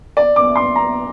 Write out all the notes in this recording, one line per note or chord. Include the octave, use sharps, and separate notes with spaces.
D5
D6
C6
A#5